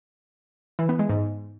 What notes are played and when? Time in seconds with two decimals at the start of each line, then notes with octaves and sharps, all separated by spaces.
0.79 E3
0.89 B3
0.99 G#3
1.09 G#2